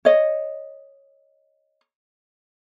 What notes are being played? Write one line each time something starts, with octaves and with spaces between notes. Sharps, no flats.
C#5 D#5